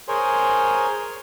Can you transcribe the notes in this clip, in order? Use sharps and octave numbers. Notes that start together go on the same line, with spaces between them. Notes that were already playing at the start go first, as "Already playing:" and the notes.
G#4 A#4 C5 C#5 G#5 C6